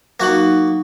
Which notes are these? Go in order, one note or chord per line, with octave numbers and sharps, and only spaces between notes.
F#3 A#3 D#4 F#4